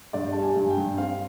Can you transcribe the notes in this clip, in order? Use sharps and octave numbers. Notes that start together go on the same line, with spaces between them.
G2 D5
G3 A5
G#5
G2
G5
G2
C4 F5